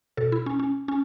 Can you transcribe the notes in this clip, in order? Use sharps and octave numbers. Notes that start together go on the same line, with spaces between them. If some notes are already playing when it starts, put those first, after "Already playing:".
B2 A4
E4
C#4
C#4
C#4